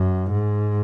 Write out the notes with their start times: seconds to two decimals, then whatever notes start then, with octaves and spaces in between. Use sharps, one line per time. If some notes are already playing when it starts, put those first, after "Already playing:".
Already playing: F#2
0.31 G#2